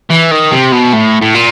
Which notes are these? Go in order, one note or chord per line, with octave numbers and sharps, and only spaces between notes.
E3
D#3
C3
B2
A2
A2
A#2